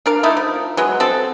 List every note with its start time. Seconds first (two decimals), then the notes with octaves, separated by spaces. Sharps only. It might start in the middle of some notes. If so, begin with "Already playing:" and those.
0.06 D4 A#4 F5
0.23 A3 D#4 E4
0.37 F3
0.77 F#3 G#3 B3
1.00 C4 A4